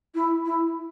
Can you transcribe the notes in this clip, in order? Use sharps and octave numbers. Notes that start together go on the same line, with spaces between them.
E4
E4